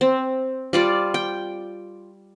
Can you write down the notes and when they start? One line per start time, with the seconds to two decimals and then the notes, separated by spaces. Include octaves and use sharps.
0.01 C4
0.73 G3 F4 D5
1.14 G5